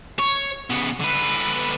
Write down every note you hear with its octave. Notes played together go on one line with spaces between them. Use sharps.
C#5
C#3 B3
D3 B4